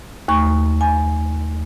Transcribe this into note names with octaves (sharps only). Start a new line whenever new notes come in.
D#2 A3 C#6
G#5